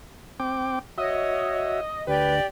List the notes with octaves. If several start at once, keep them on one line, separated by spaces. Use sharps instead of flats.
C4 G5 D6
F#4 C#5 D#5 E5
D2 G4 B4 D5 G5